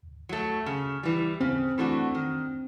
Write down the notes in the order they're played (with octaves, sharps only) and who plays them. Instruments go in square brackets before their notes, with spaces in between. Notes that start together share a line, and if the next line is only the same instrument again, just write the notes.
[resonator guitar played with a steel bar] F#3 A3
C#3
E3 G3
[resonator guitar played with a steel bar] C#3 [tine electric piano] C4
[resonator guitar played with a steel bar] E3 A3 D4 F#4
D#3